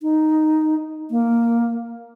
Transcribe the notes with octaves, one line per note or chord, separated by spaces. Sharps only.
D#4
A#3